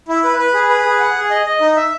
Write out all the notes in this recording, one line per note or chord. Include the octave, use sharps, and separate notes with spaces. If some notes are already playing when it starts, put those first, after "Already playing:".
E4
B4
B4
G#4
B4
G#4
F#5
G#4
D#5
D#5
D#4
E5